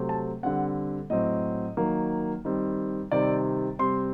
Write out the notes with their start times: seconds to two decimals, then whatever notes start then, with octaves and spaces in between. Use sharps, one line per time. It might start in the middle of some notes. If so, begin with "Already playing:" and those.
Already playing: C3 F#3 A3 C4
0.09 A5
0.43 D3 G3 C4 F#5
1.10 A2 F#3 C4 D#5
1.77 D#3 F#3 A#3
2.45 D#3 G3 C4
3.12 C3 D#3 G3 C4 D5
3.79 C3 G3 C4 C6